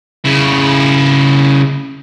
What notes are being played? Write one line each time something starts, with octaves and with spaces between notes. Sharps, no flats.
C#3 E4